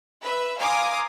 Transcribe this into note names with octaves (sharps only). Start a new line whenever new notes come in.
B4 E5
F5 G#5 A#5 C6 D6 D#6